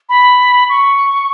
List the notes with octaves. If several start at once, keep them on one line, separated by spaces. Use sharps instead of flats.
B5
C#6